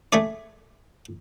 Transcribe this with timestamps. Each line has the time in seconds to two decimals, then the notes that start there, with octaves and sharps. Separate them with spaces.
0.13 A3 G#4 D5